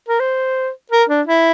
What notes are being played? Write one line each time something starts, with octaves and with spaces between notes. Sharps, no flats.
A#4
C5
A#4
D4
E4